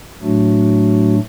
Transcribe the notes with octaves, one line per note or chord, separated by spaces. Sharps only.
A2 F#3 A3 D4 F#4